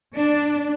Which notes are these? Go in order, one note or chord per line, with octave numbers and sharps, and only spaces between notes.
D4